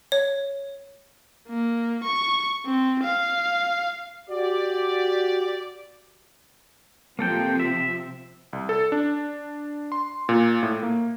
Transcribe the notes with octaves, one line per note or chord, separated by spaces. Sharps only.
C#5
A#3
C#6
C4
F5
F#4 G4 D5
C3 F3 A#3 C4 A4 G5
E5
C2
A4
D4
C6
A#2
A2
A#3